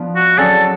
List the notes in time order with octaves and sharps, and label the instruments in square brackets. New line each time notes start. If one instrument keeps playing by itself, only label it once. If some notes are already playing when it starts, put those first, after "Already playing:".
Already playing: [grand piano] F3 B3 D4 F4
[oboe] F#4
[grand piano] F#3 C#4 G#4 D5 [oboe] A4